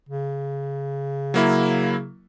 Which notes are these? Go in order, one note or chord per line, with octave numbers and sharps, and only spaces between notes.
C#3
F#3 A#3 E4